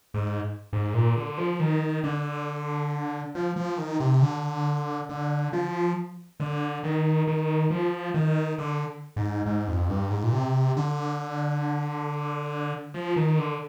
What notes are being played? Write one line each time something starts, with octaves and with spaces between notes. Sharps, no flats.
G#2
G#2
A#2
D3
F3
D#3
D3
F3
F3
D#3
C3
D3
D3
F3
D3
D#3
D#3
F3
D#3
D3
G#2
G#2
F2
G2
G#2
A#2
C3
D3
F3
D#3
D3